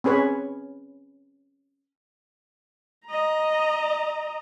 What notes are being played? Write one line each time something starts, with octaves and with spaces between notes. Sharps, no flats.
C4 C#4 G#4 B4 C#5
D#5 A#5